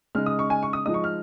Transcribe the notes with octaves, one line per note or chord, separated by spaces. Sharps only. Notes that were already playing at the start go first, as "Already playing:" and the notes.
C#3 G#3 D#4 F6
D#6
C#6
G#5
C#6
D#6
F3 G#3 D#4 D#6
C#6
F6